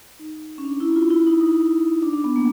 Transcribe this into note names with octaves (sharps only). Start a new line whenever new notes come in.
D#4
C#4
D4
E4
F4
E4
D#4
D#4
D4
D4
B3
A#3